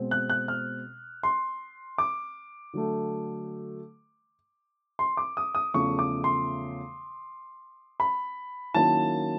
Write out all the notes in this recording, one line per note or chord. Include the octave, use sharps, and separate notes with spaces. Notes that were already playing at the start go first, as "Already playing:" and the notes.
Already playing: B2 G#3 C4
F#6
F#6
F6
C6
D6
D3 F#3 A3
C6
D6
D#6
D#6
E2 C#3 F3 A3 C#6
D6
C6
B5
D#3 F#3 A#3 C#4 E4 A5